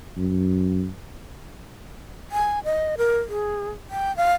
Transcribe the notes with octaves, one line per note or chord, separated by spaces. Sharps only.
F#2
G#5
D#5
A#4
G#4
G5
F5